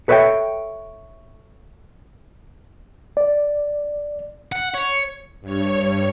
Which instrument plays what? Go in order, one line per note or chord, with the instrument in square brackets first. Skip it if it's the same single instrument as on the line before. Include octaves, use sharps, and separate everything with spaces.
[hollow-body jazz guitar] A4 B4 C#5 D#5 E5 G5
[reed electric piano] D5
[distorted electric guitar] F#5
C#5
[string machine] G2 C#5